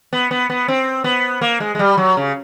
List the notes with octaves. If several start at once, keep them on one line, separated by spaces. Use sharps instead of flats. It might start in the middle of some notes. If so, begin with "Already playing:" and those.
B3
B3
B3
C4
B3
A#3
G#3
G#3
G3
F#3
C#3